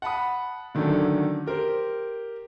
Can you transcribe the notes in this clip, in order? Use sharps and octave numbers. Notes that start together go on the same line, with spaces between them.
F#5 A5 B5 D#6
D3 D#3 F#3 A3 C#4 D4
G4 A#4 C5